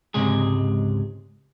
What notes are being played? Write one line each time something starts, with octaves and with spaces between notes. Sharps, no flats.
C#2 G#2 C3 G#3 G#4